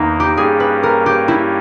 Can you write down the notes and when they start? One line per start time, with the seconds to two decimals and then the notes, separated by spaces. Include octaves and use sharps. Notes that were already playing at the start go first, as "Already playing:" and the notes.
Already playing: E2 D#3 A#3 D#4
0.20 G4
0.37 G2 G3 A#3 C#4 G#4
0.60 B4
0.83 A#4
1.06 G4
1.28 E4